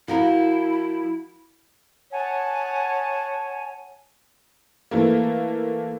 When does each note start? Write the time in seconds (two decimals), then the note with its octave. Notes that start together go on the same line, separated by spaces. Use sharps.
0.08 F3 E4 F#4 A#4
2.11 C#5 F#5 G#5 A5
4.91 E3 A3 A#3